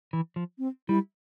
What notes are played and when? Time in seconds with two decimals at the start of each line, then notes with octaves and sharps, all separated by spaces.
0.13 E3
0.36 F3
0.59 C4
0.89 G3 E4